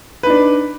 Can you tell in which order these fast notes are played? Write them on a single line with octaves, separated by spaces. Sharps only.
B4 D#4 D4